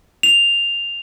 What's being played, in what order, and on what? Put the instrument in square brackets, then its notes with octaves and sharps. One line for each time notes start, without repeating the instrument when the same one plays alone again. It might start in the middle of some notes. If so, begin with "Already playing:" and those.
[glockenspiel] F7